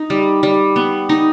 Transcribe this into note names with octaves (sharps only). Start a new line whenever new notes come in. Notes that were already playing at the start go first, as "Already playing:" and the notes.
Already playing: D#4
G3
G3
B3
D#4